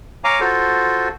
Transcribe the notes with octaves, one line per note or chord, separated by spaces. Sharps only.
C#5 F5 G#5 A#5 D6
F4 F#4 A4 C5